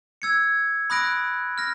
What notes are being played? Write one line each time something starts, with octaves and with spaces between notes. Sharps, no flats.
E6 G#6 C#7
B5 D#6 F#6 A#6 D7
F6 A#6